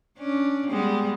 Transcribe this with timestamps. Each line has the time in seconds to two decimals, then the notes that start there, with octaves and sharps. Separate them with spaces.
0.18 C#4 D4
0.69 G3 G#3 B3